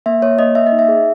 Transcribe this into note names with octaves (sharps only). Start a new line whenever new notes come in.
A#3 E5
A#3 C#5
A#3 D#5
A#3 E5
D#5
D#4
E5
G#4